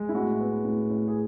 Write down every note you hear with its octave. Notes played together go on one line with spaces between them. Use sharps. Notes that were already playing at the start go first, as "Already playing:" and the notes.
Already playing: G#3
E4
A2 F#4
B3
A2
A2
G#4